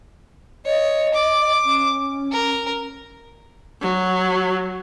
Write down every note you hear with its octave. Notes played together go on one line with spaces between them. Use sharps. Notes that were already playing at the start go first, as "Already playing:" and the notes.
C#5 D#5
D6
C#4
A#4
F#3